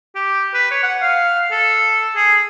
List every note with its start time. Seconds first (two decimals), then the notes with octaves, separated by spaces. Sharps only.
0.15 G4
0.54 B4
0.71 C#5
0.83 F#5
1.02 F5
1.51 A4
2.16 G#4